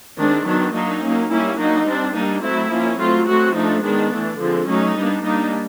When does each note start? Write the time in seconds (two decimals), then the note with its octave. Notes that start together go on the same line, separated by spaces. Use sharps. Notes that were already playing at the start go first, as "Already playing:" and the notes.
0.19 D#3 G#3 C4 D4
0.47 D#3 F#3 B3 D4
0.75 F#3 A#3 D4 D#4
1.03 F#3 A#3 C#4
1.31 G3 A#3 C#4 E4
1.59 F#3 A#3 D4 D#4
1.87 G3 C4 D4
2.15 G3 A#3 D4 D#4
2.43 F#3 A3 C4 E4
2.72 F3 A#3 C#4
2.99 F#3 A3 C4 F4
3.28 F#3 A3 C4 F#4
3.55 F3 A3 D4 D#4
3.84 D#3 G#3 B3 D4
4.12 E3 A3 D4
4.40 D3 F3 G#3 C4
4.68 F#3 A3 C#4 D#4
4.96 G3 B3 D4
5.24 G3 A#3 D4 D#4